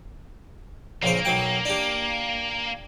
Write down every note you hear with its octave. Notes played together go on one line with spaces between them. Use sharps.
A#1 C#3 A#3 C5
B1 F#3 G5
D4 G4